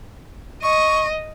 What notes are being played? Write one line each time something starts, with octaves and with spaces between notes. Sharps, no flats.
D#5 C#6